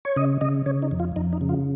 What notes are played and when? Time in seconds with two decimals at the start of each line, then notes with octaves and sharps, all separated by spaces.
0.05 C#5
0.16 C#3 D#5
0.41 C#3 D#5
0.66 C#3 C#5
0.82 D#4
0.91 F2
1.00 F4
1.16 F2 D#4
1.33 D#4
1.41 C#3
1.49 F4